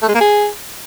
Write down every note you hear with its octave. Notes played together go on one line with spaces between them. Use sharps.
A3
G#3
A#3
G#4